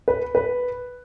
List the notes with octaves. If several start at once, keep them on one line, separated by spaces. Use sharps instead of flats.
B4
B4